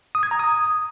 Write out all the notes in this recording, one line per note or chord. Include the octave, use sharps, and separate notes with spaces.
D#6
G#6
A#5
D#6